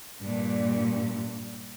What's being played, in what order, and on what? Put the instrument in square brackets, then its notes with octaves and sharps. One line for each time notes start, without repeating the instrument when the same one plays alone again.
[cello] G2 A#2